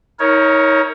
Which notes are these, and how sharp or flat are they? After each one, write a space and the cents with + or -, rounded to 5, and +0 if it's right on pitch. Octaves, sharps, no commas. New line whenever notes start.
D#4 +40 A#4 +0 C#5 +0